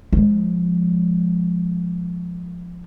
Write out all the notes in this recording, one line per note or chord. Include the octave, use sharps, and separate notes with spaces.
F3 G#3